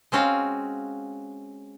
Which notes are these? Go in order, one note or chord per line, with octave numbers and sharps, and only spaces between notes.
G#3 C4 C#4 F#4 F5